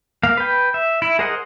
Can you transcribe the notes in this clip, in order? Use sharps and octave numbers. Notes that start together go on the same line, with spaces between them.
A#3 F5
B4 G5
E5
E4
G#4 A#4 C5 D#5 F#5